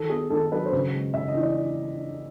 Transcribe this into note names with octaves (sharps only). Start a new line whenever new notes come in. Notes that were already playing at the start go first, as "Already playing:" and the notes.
Already playing: D#3 A4
B3 G#4
D#3 A4
F#3 B4
C5
C#3 C#5
G#3
C#3 E5
D#5
E3
D5